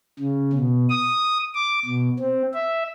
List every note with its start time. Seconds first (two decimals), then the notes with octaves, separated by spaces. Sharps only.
0.19 C#3
0.53 B2
0.89 D#6
1.54 D6
1.86 B2
2.19 C4
2.54 E5